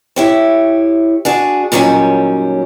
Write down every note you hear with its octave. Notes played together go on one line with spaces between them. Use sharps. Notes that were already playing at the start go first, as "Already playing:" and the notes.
E4 G4 C#5
D4 F#4 G#4
A#2 D#3 F#3 G3 C#4